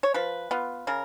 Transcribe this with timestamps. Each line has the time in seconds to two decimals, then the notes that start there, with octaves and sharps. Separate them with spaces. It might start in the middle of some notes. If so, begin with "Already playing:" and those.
0.03 C#5
0.14 F3 B4
0.51 B3 F4
0.87 C#3 A#4